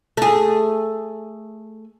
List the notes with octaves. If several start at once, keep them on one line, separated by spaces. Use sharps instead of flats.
A3 G#4